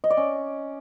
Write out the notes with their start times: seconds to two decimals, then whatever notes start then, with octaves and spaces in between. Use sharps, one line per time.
0.04 D#5
0.10 D5
0.17 C#4